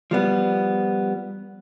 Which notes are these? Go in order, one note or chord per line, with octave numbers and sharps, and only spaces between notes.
F3 G3 B3